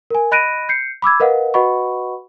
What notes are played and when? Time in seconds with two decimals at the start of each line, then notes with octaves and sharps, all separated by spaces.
0.10 A#4 G#5
0.31 D#5 B5 F#6 A#6 D7 D#7
0.69 G6 C7 C#7
1.02 B5 D6 E6 G#6
1.20 A#4 B4 D#5 F5 F#5
1.54 F#4 B4 D#5 F#5 B5 C#6